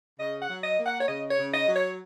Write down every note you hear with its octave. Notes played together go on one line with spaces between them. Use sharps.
C#3 D#5
F#5
F#3
D#5
A#3
F#5
C#5
C#3 D#5
C#5
C#3
D#5
F#3
C#5